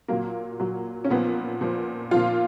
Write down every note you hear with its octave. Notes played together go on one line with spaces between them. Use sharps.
A#2 F#3 A#3
A#2 F#3
C#4
A#2 F3 B3
A#2 F3
A#2 F3 F4